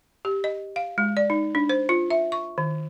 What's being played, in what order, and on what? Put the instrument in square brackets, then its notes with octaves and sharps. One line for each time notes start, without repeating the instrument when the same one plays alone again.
[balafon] G4
D#5
F5
G#3
D5
D#4
D4
C5
F4
E5
C#6
D#3